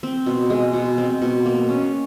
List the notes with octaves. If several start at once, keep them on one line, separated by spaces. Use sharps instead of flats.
C4
B2
G#3
B2
C4
B2
A#3
C#4